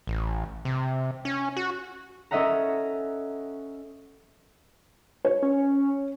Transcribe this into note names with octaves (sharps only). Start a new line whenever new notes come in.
A1
C3
C#4
F#4
C#4 A4 D#5 E5 F#5 A#5
C#5
C#4